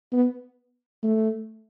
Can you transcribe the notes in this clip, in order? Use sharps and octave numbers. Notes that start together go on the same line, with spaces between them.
B3
A3